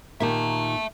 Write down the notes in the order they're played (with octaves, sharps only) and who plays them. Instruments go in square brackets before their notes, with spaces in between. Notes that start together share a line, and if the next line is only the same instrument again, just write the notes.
[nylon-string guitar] A#2 D#3 G4 [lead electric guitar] E5 A5